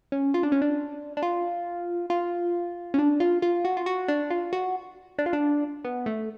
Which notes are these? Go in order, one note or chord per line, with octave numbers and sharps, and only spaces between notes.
C#4
F4
D4
C#4
D4
D4
F4
F4
C#4
D4
F4
F4
F#4
F4
F#4
D4
F4
F#4
D4
F4
D4
B3
A3